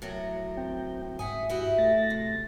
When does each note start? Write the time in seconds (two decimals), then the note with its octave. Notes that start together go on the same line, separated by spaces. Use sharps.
0.02 A2 F#3 A#4
0.57 C4 G5
1.19 G#2 E5 F#5 G#5 D#6
1.50 E4 F#4 G4
1.78 A3 A6 A#6
2.10 C3